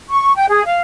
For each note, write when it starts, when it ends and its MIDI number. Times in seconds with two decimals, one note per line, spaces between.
0.09 0.33 85
0.35 0.45 79
0.48 0.63 68
0.65 0.82 77